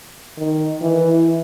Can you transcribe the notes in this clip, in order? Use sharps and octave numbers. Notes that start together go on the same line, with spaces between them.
D#3
E3